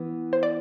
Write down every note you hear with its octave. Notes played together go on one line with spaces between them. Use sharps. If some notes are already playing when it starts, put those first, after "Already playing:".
Already playing: E3 B3
C5
D5